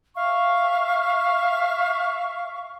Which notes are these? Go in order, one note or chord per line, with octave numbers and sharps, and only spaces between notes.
E5 F5 C#6